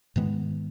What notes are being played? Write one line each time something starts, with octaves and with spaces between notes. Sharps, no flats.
G#2 D#3 G#3 B3